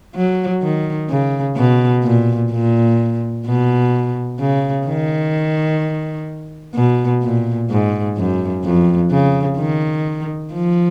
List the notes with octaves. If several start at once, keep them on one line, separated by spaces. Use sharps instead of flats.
F#3
D#3
C#3
B2
A#2
A#2
B2
C#3
D#3
B2
A#2
G#2
F#2
F2
C#3
D#3
F3